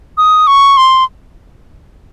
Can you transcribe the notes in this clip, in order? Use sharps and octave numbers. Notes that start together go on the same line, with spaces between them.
D#6
C#6
C6